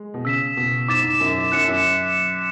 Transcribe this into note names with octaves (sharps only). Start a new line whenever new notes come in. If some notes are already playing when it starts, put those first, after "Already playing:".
Already playing: G#3
B2
C#3 E6 B6 E7
B2
G#2 D6 A6 E7
G#2
F#2
F#2 F#6 C#7 E7
F#2